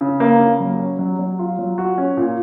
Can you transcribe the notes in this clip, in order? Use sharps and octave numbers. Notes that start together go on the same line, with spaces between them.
C#3
A#3
C#3
F#3
C#4
F#3
F#3
F4
F#3
F#4
C#4
A#2